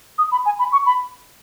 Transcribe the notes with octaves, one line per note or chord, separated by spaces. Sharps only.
D#6
B5
G#5
B5
C#6
B5